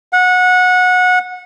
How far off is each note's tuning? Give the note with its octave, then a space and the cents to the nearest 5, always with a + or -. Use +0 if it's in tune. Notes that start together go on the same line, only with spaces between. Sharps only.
F#5 -20